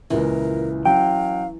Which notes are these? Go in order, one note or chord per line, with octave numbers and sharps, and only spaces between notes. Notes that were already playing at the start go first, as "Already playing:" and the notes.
C#2 A#2 C#3 E3 A#4
F#3 C#4 F5 G5